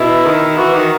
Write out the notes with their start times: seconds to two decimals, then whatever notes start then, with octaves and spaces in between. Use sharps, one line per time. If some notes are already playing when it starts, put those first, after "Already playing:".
Already playing: B2 E4
0.25 D#3
0.57 E3 F#4
0.74 D#3